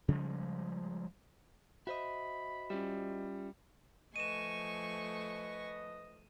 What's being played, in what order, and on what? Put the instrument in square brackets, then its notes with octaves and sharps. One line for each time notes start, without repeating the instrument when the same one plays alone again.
[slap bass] C#3 F3 G3 G#3
[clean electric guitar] F#4 C5 D#5 [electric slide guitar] E5 [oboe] B5
[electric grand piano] G3 [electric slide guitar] C#4 F4 E5
[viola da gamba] F3 A3 [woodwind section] B4 D#5 [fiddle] G#5 C#6 [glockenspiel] D#7 E7